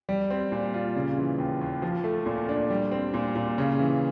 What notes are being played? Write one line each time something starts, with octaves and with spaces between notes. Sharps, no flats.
G3
C4
A#2
F4
C#3
E3
D#2
D#2
F3
A3
A#2
D4
G3
C4
A#2
A#2
C#3
E3